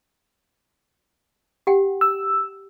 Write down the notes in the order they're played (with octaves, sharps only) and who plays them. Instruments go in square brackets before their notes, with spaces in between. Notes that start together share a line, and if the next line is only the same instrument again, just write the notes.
[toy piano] G4 F#5 G5
[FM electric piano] E6